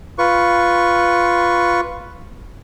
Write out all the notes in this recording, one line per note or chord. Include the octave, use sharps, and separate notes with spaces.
F4 B4 C#6